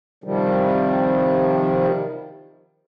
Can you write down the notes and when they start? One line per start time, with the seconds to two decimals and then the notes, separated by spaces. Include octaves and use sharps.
0.24 C3 D#3 F3 G3